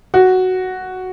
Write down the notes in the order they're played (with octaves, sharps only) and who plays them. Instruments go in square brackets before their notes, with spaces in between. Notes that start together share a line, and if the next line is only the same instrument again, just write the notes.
[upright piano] F#4